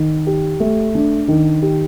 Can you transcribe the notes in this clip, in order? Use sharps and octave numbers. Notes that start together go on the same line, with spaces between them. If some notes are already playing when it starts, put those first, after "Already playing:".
Already playing: D#3
G4
A3
D4
D#3
G4